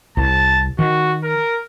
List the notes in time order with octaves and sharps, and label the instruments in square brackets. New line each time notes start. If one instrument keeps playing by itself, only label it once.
[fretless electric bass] C2 [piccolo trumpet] A5
[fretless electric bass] D#3 [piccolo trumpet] F#4
[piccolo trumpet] A#4